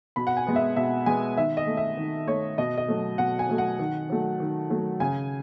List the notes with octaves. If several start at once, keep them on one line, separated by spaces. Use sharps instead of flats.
B2 B5
F#5
G#5
G#3 B3
E5
B2 E5
G#3 B3 G#5
D#3 E5
D#5
A3
E5
D#3
A3 C#5
B2 D#5
D#5
F#3 A3
B2 F#5
G#5
F#3 A3
F#5
D#3
F#3 A3
D#3
F#3 A3
C#3 G#5